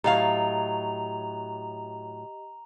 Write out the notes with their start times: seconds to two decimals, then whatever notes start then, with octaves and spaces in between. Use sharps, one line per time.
0.04 A2 F#3 G4 D#5 F5 A#5 F7